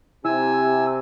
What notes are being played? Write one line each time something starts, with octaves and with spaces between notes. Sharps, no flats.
C3 E4 G#5 E6